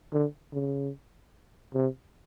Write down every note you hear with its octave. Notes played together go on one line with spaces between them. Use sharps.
D3
C#3
C3